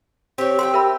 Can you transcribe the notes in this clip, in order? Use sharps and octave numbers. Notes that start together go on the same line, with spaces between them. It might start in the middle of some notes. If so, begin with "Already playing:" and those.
C4 G4 C#5
G4 F#5 G5 C6
A#4 E5 B5